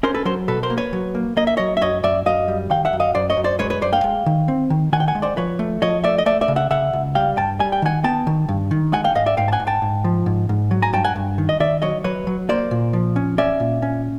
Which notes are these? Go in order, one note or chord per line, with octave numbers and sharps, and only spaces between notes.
C#4 A#4 C5
A4 B4
F#3 A#4 C5
B2 A4 B4
A#4 C5
A#3
B4 C#5
F#3
A#3
A#3 D#5
E5
F#3 C#5 D#5
E5
F#2 C#5 D#5
F#2 D5 E5
F#2 D#5 F5
G3
D#3 F5 G5
E5 F#5
F#2
D#5 F5
F#2 C5 D5
C#5 D#5
F#2
C5 D5
G#3 B4 C#5
B4 C#5
F#2 C5 D5
F5 G5
G#3
D#3
C4
D#3
D#3 F#5 G#5
G5
F#5 G#5
G#3
C5 D5
F3 B4 C#5
A3
F3 C#5 D#5
A3 D5 E5
D#5
A3 D5 E5
D5 E5
C#3
E5 F#5
C#3 E5 F#5
C#2
G3 F5 G5
G2 G5 A5
G3 G#5
G5
D#3 F#5 G#5
B3 G5 A5
D#3
G2
D#3
G#3 F#5 G#5
F5 G5
G#2 D#5 F5
D5 E5
G#2 F5 G5
A5
F#5 G#5
G#2
G5 A5
G#2
F3
G#2
G#2
F#3
G#5 A#5
G2 G5 A5
F#5 G#5
G2
D#3
D#5
D#3 D5 E5
F#3 C#5 D#5
F#3 B4 C#5
F#3
A#3 C5 D5
A#2
F3
C#4
C#4 D5 E5
A#2
C#4